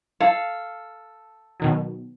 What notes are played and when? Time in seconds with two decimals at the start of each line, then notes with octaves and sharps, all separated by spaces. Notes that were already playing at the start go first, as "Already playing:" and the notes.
0.20 A4 F5
1.60 B2 D#3 F#3